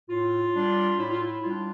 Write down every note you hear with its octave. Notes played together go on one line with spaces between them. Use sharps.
A2 F4
G3 D4
A2 E4
F4
E4
G3 D4 F4